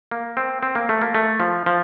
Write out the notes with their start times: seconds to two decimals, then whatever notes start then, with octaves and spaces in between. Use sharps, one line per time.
0.11 A#3
0.37 C4
0.63 C4
0.75 A#3
0.89 A3
1.01 A#3
1.15 A3
1.40 F3
1.66 F3